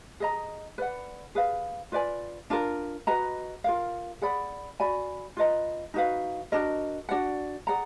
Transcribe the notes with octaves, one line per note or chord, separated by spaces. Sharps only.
G#4 D#5 A#5
B4 D5 F#5
G#4 B4 F5
F4 B4 D5 G#5
D4 F4 A#4
F#4 B4 D#5 A#5
F4 A#4 F5
G#4 D5 F#5 B5
F#4 D5 G#5 B5
F4 B4 D#5 A#5
D#4 F#4 B4 F5
D4 F#4 A#4 D#5
D4 F#4 D5 F#5
G#4 D5 F#5 A#5